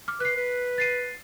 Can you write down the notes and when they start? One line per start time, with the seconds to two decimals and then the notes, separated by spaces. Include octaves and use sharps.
0.08 D6 F6
0.20 B4 F#6 C7
0.37 B4
0.78 A6 C7 D#7